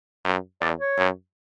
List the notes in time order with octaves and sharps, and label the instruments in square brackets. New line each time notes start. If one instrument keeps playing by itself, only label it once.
[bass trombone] F#2
[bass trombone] E2 [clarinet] D5
[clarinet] C#5
[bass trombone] F#2